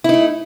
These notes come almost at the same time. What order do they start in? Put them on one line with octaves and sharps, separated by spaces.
E4 D#4 A3